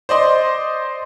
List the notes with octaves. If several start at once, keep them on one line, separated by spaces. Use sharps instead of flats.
C5 D5 D#5 C6